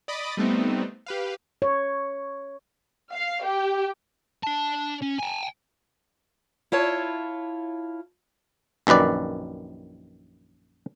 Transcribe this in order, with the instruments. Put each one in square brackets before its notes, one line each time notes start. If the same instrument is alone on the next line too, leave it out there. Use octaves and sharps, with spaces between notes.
[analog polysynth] D5 D#5 B5 D#6 A6 D7
G3 A3 B3 C4 D#4
G4 B4 F5
[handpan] C#5
[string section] F5
G4
[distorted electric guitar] D4 A5
C#4
G5 G#5
[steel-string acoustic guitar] E4 F4 C#5 A5
[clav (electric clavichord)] A#1 F#2 D#3 B4 D5